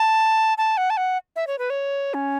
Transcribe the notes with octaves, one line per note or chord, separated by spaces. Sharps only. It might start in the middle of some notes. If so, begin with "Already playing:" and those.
Already playing: A5
A5
F#5
A5
F#5
E5
C#5
B4
C#5
C#4